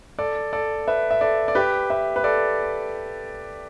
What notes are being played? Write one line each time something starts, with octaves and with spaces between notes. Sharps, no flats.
A4 D5
A4 D5
B4 E5
E5
A4 D5
D5
G4 B4
B4 E5
B4
A4 D5